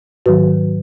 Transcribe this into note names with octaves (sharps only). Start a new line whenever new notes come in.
G#2 D#3 F#3 F#4 B4